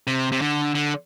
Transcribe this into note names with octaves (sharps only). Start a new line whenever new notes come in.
C3
C3
D3
D3